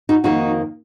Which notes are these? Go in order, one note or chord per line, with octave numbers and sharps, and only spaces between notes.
D#4 F#4
F2 D#3 A#3 D#4 F#4